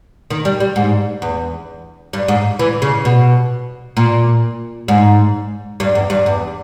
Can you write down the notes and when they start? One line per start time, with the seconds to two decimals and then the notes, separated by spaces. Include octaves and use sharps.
0.30 D#3
0.45 G3
0.60 G3
0.76 G#2
1.22 E2
2.13 G2
2.28 G#2
2.59 E3
2.82 C#3
3.05 B2
3.97 A#2
4.88 G#2
5.80 G2
5.95 E2
6.10 G2
6.26 E2